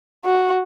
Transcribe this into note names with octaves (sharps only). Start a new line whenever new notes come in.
F#4